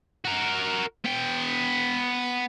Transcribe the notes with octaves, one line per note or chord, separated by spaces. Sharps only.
F#4 A#4
B3 G5